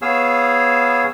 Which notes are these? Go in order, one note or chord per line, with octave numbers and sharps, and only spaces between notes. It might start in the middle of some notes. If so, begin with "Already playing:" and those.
B3 G#4 C#5 F5 E6